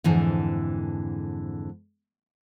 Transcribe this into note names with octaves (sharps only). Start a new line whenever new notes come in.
F2 G#2 D3 E3